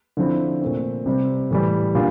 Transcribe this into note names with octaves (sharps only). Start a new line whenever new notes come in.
D3 F3 C4 E4
A#2 A3 C4
C3 G3 C4
A2 E3 G3
A#2 G3 D4 F4